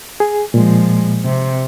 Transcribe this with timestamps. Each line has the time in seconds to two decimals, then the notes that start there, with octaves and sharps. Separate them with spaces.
0.20 G#4
0.54 A#2 F3 G#3
1.25 C3